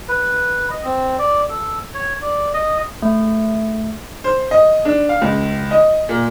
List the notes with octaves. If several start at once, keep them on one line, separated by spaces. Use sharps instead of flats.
B4
D#5
C4
D5
A4
C#5
D5
D#5
A3
C5
D#5
D4
F5
C#2
D#5
A#2